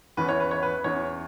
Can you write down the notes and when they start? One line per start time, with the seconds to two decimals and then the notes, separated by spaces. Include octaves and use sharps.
0.17 E2 E3 C#4 B4
0.29 C#5
0.40 B4
0.51 C#5
0.63 B4
0.84 E2 E3 C#4 C#5